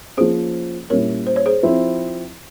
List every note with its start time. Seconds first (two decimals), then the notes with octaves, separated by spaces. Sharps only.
0.17 F3 A#3 C#4 G#4 C5
0.90 A#2 G3 C#4 E4 A#4 C#5
1.27 C5
1.36 C#5
1.46 G#4 C5
1.63 F3 C4 E4